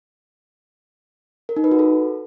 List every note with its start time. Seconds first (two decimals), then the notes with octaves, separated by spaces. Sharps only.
1.49 A#4
1.56 D#4
1.64 B4
1.71 F#4
1.79 A4